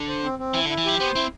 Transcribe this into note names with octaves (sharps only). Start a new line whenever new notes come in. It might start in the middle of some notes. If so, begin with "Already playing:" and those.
Already playing: D3
C5
C4
C4
E3 E4
D3
E4
E3
F3 G4
B3 C5
C4 E4